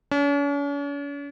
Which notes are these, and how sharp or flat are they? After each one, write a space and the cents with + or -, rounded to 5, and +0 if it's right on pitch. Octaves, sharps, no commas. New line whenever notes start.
C#4 +45